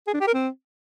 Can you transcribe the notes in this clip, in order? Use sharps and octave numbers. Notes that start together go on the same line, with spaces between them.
G#4
D4
G4
A#4
C4